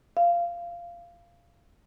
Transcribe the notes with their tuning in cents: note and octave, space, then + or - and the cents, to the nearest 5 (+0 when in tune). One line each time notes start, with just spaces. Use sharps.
F5 -15